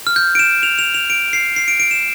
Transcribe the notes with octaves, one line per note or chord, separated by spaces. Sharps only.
F6
G6
D7
E7
F7
F7
F7
D7
C7
C7
D7
D7
E7